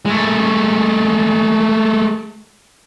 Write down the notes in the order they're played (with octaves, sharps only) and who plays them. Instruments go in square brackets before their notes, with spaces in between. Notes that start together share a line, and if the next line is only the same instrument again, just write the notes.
[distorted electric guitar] G#3 A3